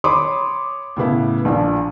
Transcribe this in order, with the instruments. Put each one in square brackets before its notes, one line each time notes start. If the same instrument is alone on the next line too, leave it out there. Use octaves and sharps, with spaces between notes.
[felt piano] C#5 B5 C6 D6 D#6
A2 C#3 B3 E4
A#1 F3 D4